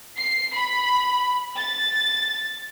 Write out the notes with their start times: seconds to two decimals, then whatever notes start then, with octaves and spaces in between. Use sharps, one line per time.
0.18 C7
0.55 B5
1.58 A6